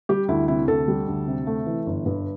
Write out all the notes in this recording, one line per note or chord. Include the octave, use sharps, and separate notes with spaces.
G3 G4
D2 E4
C3 E4
D2 A4
G3
D2
C3
A3
E3
G1
G2